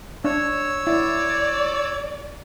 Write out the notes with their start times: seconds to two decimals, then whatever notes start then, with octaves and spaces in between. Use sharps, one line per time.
0.25 D4 C#5 E6
0.87 E4 D5